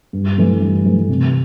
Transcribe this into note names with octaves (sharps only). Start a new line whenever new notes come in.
G2
E3 A3
G2
E3 A3
C3